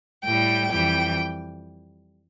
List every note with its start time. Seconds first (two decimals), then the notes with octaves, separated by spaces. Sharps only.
0.23 A2 G3 G5
0.71 F2 E3 G3 G5